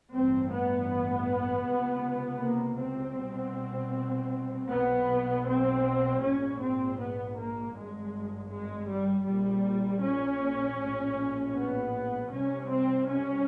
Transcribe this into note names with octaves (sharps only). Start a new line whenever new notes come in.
A1 G2 C4
B3
C#2 C3
A#3
C4
C2 B2
B1 B2 B3
C4
A#1 G#2 C#4
C4
B3
A#3
G#1 G2 G#3
G#3
G3
A#1 A#2 G3
C#4
A#1 A2
B3
C2 C3 C#4
C4
C#4